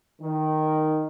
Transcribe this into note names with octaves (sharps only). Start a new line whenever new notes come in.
D#3